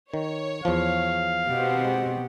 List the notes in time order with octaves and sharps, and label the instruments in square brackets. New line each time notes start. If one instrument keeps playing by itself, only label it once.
[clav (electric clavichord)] D#3 [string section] C#5
[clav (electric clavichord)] E2 F3 [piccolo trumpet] F5
[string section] B2 C4 [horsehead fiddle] G4 F#5
[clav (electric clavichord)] G#3